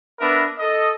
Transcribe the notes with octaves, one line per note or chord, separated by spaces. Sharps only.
B3 D4 A#4 B4 E5
A4 D#5